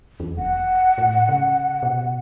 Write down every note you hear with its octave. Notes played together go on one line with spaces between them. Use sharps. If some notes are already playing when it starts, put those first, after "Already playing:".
E2
F1 F#5
A2
C#3
B2